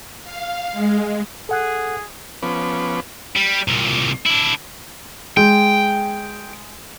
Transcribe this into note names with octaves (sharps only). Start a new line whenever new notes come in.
F5
G#3
G#4 A4 F#5 F#6
F3 B3 C#4 B4 D6
G3
C2 A#2
D4 E4
G#3 G5